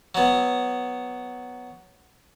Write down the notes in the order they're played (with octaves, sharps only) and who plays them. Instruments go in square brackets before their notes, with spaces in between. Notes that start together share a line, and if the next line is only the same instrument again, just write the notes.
[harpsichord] F#3 B3